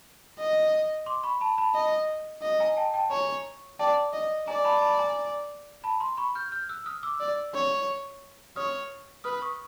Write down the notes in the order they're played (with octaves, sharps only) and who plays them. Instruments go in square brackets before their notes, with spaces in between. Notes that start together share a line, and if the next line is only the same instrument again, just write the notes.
[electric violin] D#5
[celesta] C6 D6
B5 C#6
A5 B5
A5 B5
[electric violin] D#5
D#5
[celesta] G#5 A#5
G5 A5
G5 A5
[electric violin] C#5 [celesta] G#5 A#5
[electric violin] D5 [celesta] G5 A5
[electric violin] D#5
[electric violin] D5 [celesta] G#5 A#5
[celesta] A5 B5
A5 B5
G#5 A#5
A5 B5
A#5 C6
B5 C#6
F6 G6
F6 G6
E6 F#6
D#6 F6
D6 E6
[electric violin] D5
C#5
[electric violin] C#5 [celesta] D#6 F6
[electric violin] B4 [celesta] D#6 F6
[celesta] C#6 D#6